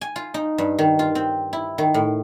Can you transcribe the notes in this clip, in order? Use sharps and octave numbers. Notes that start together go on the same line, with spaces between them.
G#5
F4
D#4
G2
D#3
F4
C4
E4
D#3
A2